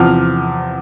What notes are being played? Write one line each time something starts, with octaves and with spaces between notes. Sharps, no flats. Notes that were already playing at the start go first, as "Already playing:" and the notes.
Already playing: E2 C3 F3 F6